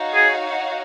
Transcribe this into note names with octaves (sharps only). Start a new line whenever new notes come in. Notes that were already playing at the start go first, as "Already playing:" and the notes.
Already playing: D#4 F#4 C#5 F5
G#4